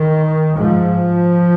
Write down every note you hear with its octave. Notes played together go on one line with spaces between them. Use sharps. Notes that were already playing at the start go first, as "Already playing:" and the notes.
Already playing: D#3
G#2 F3